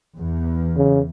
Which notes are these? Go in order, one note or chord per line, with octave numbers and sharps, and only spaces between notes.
E2
C#3